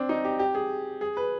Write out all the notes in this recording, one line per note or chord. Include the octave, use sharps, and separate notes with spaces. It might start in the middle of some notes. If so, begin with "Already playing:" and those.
Already playing: C4 D4
D#4
G4
G4
G#4
G#4
B4